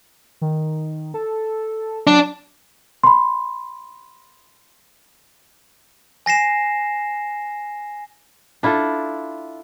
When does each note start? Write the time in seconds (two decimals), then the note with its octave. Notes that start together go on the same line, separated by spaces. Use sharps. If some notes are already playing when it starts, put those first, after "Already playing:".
0.41 D#3
1.14 A4
2.07 F#3 D4
3.04 B5 C6
6.26 G#5 A#6 C7 E7
8.63 D4 E4 F4 A4